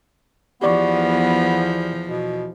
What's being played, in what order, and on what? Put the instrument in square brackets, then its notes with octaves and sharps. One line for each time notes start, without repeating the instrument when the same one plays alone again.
[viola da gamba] E2 F3 [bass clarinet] B3 [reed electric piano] G4 D5 C#6
[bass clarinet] B2